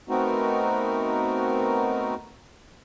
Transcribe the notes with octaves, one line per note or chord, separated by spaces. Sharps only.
A3 B3 C4 D#4 F#4 A#4